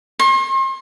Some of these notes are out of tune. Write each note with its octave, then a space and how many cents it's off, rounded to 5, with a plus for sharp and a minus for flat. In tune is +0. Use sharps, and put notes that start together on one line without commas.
C6 +40